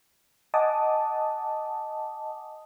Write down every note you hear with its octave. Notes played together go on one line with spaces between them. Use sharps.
D#5 F#5 G#5 A5 D6 D#6